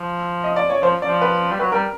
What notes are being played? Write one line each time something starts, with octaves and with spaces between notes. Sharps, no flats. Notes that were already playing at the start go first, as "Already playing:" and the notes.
Already playing: F3
D#5
D5
C#5
F3 C5
D5
F3
B4
G3
F#3 B4
G3 A#4